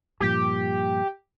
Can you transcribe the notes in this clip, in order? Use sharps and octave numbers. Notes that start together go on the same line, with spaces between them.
G2 A#2 F3 G4